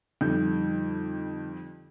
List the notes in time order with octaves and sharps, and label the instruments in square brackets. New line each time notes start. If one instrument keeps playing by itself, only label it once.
[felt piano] F2 G3 [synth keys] D3 D#4 G6